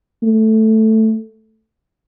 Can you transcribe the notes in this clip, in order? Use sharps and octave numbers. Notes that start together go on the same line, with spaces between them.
A3